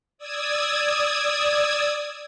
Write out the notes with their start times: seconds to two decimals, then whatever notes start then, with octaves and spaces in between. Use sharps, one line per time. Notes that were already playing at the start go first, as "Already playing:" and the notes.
0.18 D5 D#6 E6 G#6